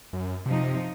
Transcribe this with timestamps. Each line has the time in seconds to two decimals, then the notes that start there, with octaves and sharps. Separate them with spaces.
0.13 F#2
0.46 C3 F3 D#4